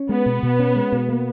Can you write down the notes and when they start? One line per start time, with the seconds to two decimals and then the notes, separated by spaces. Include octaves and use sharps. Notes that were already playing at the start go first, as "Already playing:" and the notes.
Already playing: C#4
0.09 G#3 B3
0.26 B2
0.43 B2
0.59 C#4
0.76 G#3
0.92 B2
1.09 A#3